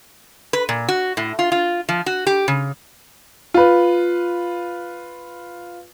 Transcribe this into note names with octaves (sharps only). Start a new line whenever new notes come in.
B4
A#2
F#4
A2
F4
F4
F3
F#4
G4
C#3
F4 B4